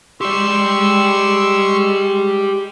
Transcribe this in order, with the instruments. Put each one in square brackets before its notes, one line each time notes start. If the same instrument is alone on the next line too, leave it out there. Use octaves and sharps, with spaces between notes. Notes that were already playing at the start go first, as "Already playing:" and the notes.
[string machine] G#3 [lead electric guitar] G4 D5 [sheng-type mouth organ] C6 C#6 E6